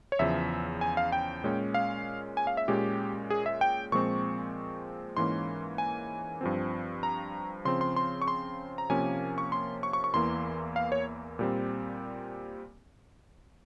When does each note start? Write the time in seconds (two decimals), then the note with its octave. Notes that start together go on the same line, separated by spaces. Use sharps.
0.12 C#5
0.19 E2 C#3 F3 E5
0.81 G#5
0.97 F5
1.12 G5
1.44 A#2 G#3 C#4
1.74 F5
2.37 G#5
2.47 F5
2.57 E5
2.68 A#2 G#3 C#4 G4
3.30 G#4
3.46 E5
3.61 G5
3.92 A#2 F3 G#3 C4 C#6
5.17 G#2 E3 A#3 C#4 C6
5.78 G#5
6.41 G2 F3 C4
7.03 A#5
7.65 C#3 F3 C4 C6
7.81 C6
7.96 C6
8.22 C#6
8.28 C6
8.78 A#5
8.90 C3 F3 A#3 C#4 G#5
9.38 C#6
9.52 C6
9.83 C#6
9.93 C#6
10.04 C#6
10.14 E2 E3 A#3 C6
10.76 F5
10.92 C#5
11.39 A#2 G3 C4